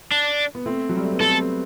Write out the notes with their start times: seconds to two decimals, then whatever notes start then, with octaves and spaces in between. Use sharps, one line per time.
0.11 D4
0.55 B3
0.66 A3 C4
0.89 F#3
0.97 G3
1.05 A3
1.12 B3
1.20 A3 C4 A4